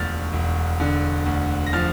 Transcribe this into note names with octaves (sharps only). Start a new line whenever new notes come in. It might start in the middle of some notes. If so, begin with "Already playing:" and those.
Already playing: E1 D2 F3 F6 A6
E1
D3
D2
A#6
F3 F6 A6